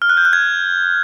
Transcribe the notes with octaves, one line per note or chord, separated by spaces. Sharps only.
F6
F#6
G6
F#6
G#6